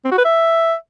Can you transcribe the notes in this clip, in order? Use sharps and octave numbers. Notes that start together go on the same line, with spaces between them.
C4
F#4
B4
E5